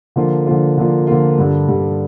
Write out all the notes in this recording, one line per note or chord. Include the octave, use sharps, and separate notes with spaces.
D3 F3 A#3 F4
D3 F3 A#3 F4
D3 F3 A#3 F4
D3 F3 A#3 F4
G2 D3 G3
G2 D3 G3